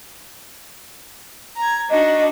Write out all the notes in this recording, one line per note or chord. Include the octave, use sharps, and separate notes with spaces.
A#5 G#6
D4 D#4 F#4 D#5